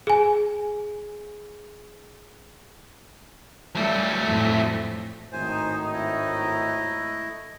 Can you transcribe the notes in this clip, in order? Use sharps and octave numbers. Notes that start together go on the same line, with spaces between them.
G#4 G#5
F#3 G3 A3
F2 A2
G#1 A2 D#4 C5 G#5
A3 E4 D#5